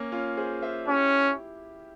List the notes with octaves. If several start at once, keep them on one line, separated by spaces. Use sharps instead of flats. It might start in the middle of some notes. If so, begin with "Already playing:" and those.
Already playing: A#3 C#4
C#4 F4
G#4 C5
C5 E5
C#4 E4 G4